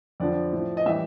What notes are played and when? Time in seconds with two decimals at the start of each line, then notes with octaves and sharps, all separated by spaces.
0.20 F2 D3 F3 D5
0.53 A2 F3
0.77 D#5
0.86 A2 E3 G3 E5